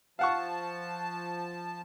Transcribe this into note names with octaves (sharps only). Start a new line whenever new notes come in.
F3 F5 F#5 A5 C#6